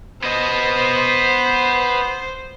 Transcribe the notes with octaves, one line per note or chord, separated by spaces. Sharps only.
B3 C5 D#5